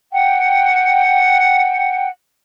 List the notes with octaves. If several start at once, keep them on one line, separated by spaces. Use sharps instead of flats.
F#5 G5